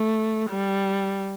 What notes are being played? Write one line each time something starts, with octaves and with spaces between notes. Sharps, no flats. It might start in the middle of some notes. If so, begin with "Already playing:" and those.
Already playing: A3
G3